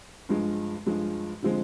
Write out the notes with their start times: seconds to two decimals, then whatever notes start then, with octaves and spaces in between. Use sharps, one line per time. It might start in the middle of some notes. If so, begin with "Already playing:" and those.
0.29 G2 F3 G#3
0.86 G2 F3 G#3
1.43 D3 F3 G#3 C4